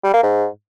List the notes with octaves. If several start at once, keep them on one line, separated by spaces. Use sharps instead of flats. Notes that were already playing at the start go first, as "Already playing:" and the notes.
G3
A#3
G#2